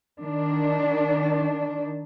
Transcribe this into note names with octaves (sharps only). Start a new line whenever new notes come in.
D#3 D4